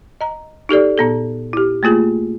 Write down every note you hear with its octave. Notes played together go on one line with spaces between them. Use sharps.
D#5 A#5
D#4 G4 A4 D5
A#2 B3 A4
E4 G4
A3 A#3 F4 G#4